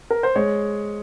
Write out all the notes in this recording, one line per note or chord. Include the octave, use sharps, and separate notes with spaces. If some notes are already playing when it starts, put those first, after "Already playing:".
A#4
C5
G#3 C#5